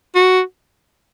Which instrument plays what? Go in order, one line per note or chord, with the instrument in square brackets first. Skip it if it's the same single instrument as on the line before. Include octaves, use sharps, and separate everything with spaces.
[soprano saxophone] F#4